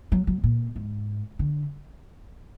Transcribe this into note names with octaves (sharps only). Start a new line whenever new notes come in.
F#3
F#3
A#2
G#2
D3